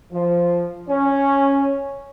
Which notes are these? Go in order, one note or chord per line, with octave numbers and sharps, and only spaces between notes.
F3
C#4